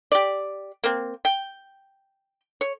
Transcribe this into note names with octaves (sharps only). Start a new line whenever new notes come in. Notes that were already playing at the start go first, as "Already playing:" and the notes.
G4 D5
A#3 C4
G5
C#5